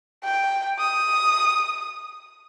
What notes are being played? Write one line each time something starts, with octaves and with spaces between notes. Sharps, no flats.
G5
D#6